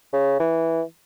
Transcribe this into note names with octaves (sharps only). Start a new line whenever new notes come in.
C#3
E3